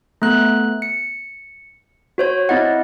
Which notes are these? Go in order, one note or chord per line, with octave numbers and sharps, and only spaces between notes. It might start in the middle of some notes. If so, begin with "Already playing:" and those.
A3 B3 F#6
C#7
F#4 C5 C#5
C4 E4 D#5 F#5